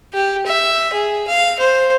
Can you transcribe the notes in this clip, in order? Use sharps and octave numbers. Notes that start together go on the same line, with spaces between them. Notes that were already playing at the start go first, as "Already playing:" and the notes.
G4
E5
G#4
F5
C5